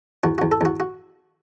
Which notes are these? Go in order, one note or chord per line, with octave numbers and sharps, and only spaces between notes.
E2 F#4
E2 F#4
A4
E2 F#4
F#4